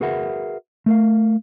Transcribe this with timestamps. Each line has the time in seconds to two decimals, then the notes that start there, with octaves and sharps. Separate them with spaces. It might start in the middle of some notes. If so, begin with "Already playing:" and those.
0.01 F#4 G#4 A#4 B4 E5 F#5
0.86 A3 A#4 F5